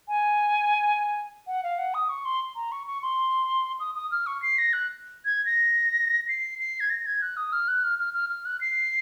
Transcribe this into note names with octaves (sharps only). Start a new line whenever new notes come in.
G#5
F#5
F5
F#5
D#6
C#6
C6
A#5
C#6
C#6
C6
D#6
D#6
F6
C#6
C7
A#6
F#6
G#6
A#6
C7
C7
G#6
A#6
G#6
F#6
D#6
F6
F#6
F6
F6
F6
F6
F#6
C7